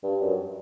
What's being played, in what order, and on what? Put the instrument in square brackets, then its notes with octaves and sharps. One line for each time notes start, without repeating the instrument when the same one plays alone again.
[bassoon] G2
F#2